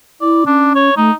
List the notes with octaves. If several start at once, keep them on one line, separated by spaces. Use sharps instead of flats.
E4 D5
C#4 D4
C#5
A3 D#4